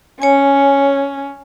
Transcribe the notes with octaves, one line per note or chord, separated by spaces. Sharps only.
C#4 C#5 G#5